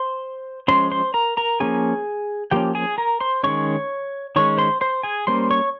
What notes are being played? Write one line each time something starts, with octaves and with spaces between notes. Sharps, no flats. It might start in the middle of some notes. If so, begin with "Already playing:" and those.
Already playing: C5 C6
F3 G#3 C#4 C5 C6
C5 C6
A#4 A#5
A#4 A#5
F3 A#3 C#4 G#4 G#5
F3 A#3 C#4 G4 G5
G#4 G#5
A#4 A#5
C5 C6
D#3 G#3 C#4 C#5 C#6
D#3 G#3 C#4 C#5 C#6
C5 C6
C5 C6
G#4 G#5
G3 A#3 C#4 C5 C6
C#5 C#6